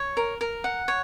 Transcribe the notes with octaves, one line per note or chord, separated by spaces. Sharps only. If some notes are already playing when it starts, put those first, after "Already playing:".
Already playing: C#5
A#4
A#4
F#5
C#5